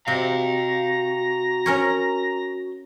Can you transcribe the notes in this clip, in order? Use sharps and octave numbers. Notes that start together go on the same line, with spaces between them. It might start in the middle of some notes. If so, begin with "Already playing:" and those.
C3 F#4 F5 G5 A#5
C#4 A#4 C#5